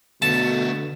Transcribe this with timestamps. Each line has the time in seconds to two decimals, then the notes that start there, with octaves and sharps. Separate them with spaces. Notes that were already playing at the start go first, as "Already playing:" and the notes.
0.22 B2 D3 A3 B3 A5